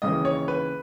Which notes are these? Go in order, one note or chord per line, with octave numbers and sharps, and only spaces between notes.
D#2 C#3 E3 D#5
C#5
B4